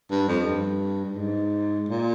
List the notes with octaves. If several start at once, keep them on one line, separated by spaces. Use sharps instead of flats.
G2
F2
G2
G2
G#2
A#2